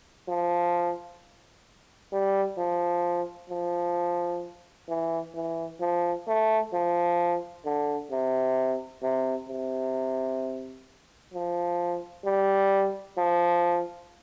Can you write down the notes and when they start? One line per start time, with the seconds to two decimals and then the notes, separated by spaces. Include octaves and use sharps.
0.28 F3
2.13 G3
2.57 F3
3.50 F3
4.89 E3
5.35 E3
5.80 F3
6.27 A3
6.73 F3
7.65 D3
8.12 C3
9.02 C3
9.49 C3
11.34 F3
12.25 G3
13.18 F3